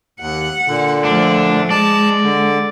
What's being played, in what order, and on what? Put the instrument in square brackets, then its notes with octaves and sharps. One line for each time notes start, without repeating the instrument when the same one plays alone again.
[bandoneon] D#2 [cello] F#5
[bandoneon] A#2 D3
[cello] F3 A3 [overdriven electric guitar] D4
[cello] G#3 [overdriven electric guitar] D5 [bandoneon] A5
[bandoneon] D3